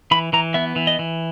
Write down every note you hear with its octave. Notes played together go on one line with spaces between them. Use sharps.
E3 B5
E3 A#5
B3 E5
E3
D#5
E3